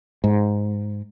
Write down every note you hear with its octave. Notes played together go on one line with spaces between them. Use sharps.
G#2